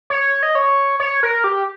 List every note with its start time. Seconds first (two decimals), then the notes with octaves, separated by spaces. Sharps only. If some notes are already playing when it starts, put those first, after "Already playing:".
0.10 C#5
0.43 D#5
0.55 C#5
1.00 C#5
1.23 A#4
1.44 G4